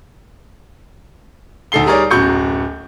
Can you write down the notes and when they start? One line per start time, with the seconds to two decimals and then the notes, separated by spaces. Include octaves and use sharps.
1.72 D2 D#4 A4 C7 G7
1.86 G3 D#4 G#4 A#4 C#5 D5
2.10 D1 F#2 F#4 C#6 G6 C#7